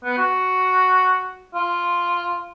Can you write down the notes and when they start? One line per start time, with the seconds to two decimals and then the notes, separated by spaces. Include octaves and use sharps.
0.04 B3
0.18 F#4
1.55 F4